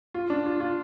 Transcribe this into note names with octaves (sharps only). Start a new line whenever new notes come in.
F4
D4
F4
F4